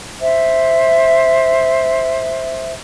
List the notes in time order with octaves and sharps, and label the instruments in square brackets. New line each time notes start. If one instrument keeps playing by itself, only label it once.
[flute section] C5 E5